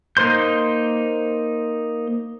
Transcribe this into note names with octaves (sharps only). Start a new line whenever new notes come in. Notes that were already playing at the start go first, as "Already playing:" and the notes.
A#3 D#4 C5 C6 G6